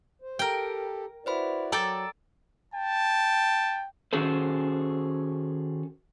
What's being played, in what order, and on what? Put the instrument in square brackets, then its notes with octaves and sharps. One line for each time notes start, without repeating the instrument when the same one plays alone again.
[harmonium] C5
[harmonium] G4 A4 [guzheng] A#4 G5
[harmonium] E4 F#4 D5 [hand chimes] B4 C5 B5
[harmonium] F#3 [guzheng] A4 D5 G5 [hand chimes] A#5 E6 A6
[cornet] G5 [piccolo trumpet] A5
[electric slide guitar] D#3 C#4 F#4 G#4 A4 C5